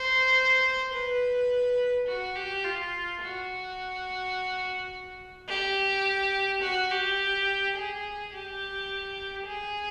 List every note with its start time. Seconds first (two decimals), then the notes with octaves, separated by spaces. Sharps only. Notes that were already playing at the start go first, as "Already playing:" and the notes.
Already playing: C5
0.94 B4
2.07 F#4
2.36 G4
2.64 F4
3.21 F#4
5.49 G4
6.62 F#4
6.91 G4
7.76 G#4
8.33 G4
9.47 G#4